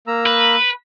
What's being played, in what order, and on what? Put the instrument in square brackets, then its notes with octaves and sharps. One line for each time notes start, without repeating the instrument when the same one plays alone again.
[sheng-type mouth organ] A#3 A#5 E6
[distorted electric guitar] B4